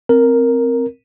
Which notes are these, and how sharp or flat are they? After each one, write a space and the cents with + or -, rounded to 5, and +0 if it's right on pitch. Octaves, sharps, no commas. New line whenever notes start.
C4 +0 A#4 +0